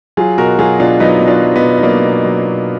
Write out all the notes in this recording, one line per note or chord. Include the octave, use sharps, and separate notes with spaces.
F#3 F4 G#4
B2 F#4 A#4
F#3 F4 G#4
B2 D4 F4
F#3 B3 D#4
B2
D4 F4
F#3
B3 D#4
B2
D#4
F#3 A#3 D4
B2
F#3
B2